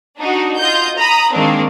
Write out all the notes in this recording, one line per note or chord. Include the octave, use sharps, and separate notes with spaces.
D4 D#4 F#4
F4 D#5 G6
A#5 B5 D#6
D#3 G#3 A#3 C4 D4